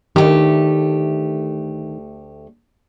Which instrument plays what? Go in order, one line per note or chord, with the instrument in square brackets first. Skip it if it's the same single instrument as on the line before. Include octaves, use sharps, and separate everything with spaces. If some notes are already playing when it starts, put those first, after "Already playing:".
[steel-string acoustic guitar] D2 A3 G4 [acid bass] D#3